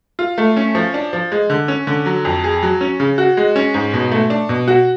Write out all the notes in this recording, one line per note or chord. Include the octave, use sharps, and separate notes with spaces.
F4
A3
C#4
F3
D4
F3
G#3
D3
C#4
D3
F#3
F2
G#4
F#3
C#4
C#3
F#4
G#3
C#4
G#2
B2
A3
D4
B2
F#4